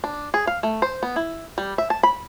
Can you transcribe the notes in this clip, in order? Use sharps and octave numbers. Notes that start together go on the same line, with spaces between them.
D4
G#4
F5
A3
C5
B3
E4
G3
E5
A5
B5